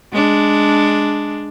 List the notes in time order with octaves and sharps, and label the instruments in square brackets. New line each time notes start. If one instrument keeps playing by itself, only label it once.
[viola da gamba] G#3 D4